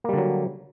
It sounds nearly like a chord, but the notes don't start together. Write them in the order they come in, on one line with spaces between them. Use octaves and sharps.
A#3 G3 D3 F#3